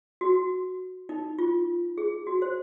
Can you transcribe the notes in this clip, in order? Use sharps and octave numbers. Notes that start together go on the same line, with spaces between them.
F#4
D#4
F4
G#4
F#4
C5